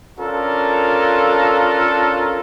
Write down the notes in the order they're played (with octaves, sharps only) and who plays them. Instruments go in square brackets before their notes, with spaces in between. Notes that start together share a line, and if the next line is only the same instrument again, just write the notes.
[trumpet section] C#4 D4 F4 A4 A#4